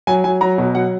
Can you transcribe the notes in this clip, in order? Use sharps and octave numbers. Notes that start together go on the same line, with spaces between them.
F#3 G#5
F#3 G#5
F#3 A#5
B2
F#3 F#5